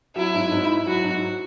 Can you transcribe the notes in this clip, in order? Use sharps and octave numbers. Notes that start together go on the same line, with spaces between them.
F#3 E4
G#2
G#2
E4
F#3 F#4
G#2